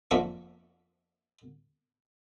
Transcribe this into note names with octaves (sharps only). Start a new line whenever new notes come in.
F2 A#3 D4 E5 C#6